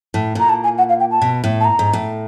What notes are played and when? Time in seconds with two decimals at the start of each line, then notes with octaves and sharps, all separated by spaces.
0.14 A2
0.35 A#2 A#5
0.49 A5
0.64 G#5
0.78 F#5
0.89 F5
1.00 G5
1.11 A5
1.22 B2
1.44 A2
1.60 A5
1.65 A#5
1.79 G#2
1.93 A2